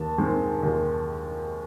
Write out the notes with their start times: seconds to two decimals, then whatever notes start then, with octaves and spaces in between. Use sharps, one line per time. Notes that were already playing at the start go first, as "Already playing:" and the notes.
Already playing: D#2 A5
0.18 D#3 G#3 C4
0.63 D#2